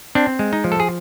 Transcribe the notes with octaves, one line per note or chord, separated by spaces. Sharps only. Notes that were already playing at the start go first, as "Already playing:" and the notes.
C4 D4
G#3
D#4
F3
A4
G#4